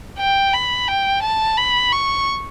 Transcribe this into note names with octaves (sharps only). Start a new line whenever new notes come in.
G5
B5
G5
A5
B5
C#6